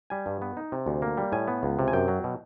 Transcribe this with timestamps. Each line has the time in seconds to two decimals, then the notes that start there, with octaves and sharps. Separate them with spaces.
0.10 G3 G#5
0.26 G2
0.42 B3
0.57 D#4
0.72 C3
0.86 D2
1.02 A#3
1.17 G3
1.32 A2 G#5
1.48 B3
1.63 C#2
1.79 C3
1.88 G#5
1.93 F#2 G5
2.08 F#3
2.24 B2